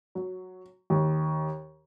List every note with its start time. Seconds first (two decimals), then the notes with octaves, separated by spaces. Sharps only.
0.15 F#3
0.90 D#2